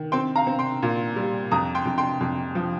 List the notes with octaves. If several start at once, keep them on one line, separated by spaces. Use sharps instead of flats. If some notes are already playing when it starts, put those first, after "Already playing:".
Already playing: D#3
C4 G5 C6
F5 A#5
C4
G5 C6
A#2
G3
F2 A#5 D#6
G5 C6
F2
G5 C6
F2
F3